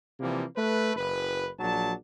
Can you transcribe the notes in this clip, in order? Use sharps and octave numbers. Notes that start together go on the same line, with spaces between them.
C3 E3 F3 G3 A#3
A3 B4
F#1 B4
A#1 F#3 D5 A5